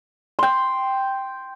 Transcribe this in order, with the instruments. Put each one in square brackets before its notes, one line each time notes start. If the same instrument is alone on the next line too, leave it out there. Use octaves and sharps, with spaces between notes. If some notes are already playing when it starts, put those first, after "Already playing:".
[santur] G5 C6